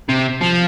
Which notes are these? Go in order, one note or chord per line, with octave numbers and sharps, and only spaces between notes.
C3
F3